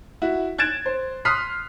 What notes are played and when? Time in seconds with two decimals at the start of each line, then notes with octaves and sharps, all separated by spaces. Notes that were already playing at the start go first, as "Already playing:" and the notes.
0.22 E4 F#4
0.58 F#6 G#6 A6 D7 E7
0.86 C5
1.25 C6 D#6 F6 F#6 B6 C7